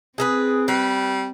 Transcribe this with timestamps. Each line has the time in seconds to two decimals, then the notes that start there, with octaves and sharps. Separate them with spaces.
0.18 C4 G#4 A#4 B4
0.68 G3 B4